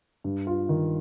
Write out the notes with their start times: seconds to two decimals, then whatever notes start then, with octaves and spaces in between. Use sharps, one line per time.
0.24 G2
0.47 F4
0.69 D#3